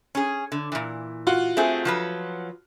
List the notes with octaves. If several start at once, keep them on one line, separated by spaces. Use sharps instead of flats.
C#4 G#4
D3
A#2 E3
F4 F#4
A3 C4 G#4
F3 F#3 B4